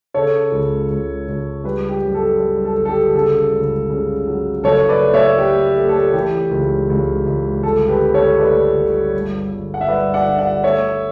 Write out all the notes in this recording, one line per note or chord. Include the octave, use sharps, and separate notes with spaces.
C#3 A4 C#5
C#2
C#2
C#2
G3 G4 B4
G4
F#2
A4
G3
A4
G1
A4
G4
C#3 A4
C#2
C#3
F#3
F#1 A4 C#5
B4 D5
A3
C#5 E5
A3 G4
A3
A4
E3 G4
C#2
C#2
C#2
G1 A4
G4 B4
G1
A4 C#5
A3 B4 D5
G1
G2
G1
F#5
E5
G2 B4 D5
D5 F#5
D3
D5 F#5
A3 C#5 E5